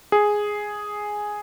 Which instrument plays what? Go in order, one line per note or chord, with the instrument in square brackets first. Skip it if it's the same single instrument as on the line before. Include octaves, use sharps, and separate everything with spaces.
[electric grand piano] G#4